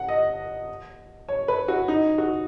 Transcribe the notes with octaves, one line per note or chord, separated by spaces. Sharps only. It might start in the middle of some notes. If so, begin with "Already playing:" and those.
Already playing: F#5
D#5
C#5
B4
F#4
D#4
F#4